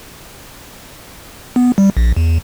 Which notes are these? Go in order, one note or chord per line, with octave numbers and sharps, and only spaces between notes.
B3
G3
A#1
E2